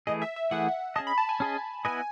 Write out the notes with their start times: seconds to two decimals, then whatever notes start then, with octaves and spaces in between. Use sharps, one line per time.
0.07 E3 A3 E4 G#4 D#5
0.22 E5
0.36 E5
0.51 E3 A3 E4 G#4 F#5
0.96 C#4 G#4 D#5 A5
1.07 B5
1.18 A5
1.29 G#5
1.40 C#4 G#4 D#5
1.85 B3 E4 B4 D#5 G#5